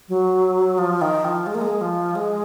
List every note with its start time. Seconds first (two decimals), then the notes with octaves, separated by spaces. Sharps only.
0.09 F#3
0.78 F3
1.01 D#3
1.25 F3
1.47 G#3
1.55 A#3
1.62 G#3
1.81 F3
2.15 G#3